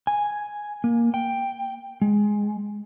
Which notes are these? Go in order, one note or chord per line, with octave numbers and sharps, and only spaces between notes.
G#5
A#3
G5
G#3